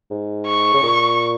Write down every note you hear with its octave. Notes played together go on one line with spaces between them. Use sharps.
G#2
C#6
C#3
A#2